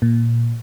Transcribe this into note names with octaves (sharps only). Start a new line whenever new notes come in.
A#2